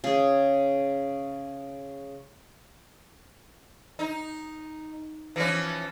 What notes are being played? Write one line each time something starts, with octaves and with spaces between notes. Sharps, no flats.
C#3 G#4
D#4
E3 F3 C#4